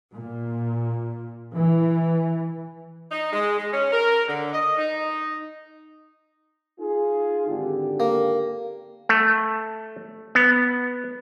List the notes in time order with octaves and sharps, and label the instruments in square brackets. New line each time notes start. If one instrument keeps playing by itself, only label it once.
[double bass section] A#2
E3
[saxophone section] D#4
G#3
G#3
C#4
A#4
D3
D#5
D#4
[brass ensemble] D#4 F4 G#4
G#1 D3 G4
[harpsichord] A#3
[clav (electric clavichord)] A3
B3